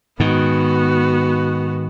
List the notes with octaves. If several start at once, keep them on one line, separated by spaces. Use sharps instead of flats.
G#2 D#3 B3 F#4